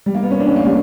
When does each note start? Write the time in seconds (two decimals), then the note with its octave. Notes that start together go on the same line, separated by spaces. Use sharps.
0.06 G3
0.14 A#3
0.23 B3
0.31 C#4
0.40 D4
0.47 C#4
0.56 A#3
0.65 G3